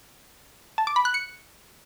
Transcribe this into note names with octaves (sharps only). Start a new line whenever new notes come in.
A5
D6
B5
F#6
C#7